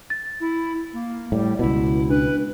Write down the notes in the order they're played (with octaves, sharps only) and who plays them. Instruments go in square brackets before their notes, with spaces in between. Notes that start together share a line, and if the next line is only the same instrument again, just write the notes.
[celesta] A6
[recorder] E4
A#3
[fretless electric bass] A2 [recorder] G3
[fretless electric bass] C#2 B2 [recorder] E4
[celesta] D4 [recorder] B4